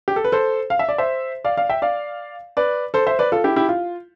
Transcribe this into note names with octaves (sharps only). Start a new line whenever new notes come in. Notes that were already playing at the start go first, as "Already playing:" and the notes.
G4
A4
B4
A4 C5
F5
E5
D5
C5 E5
D5 F5
D5 F5
E5 G5
D5 F5
B4 D5
A4 C5
C5 E5
B4 D5
F4 A4
E4 G4
E4 G4
F4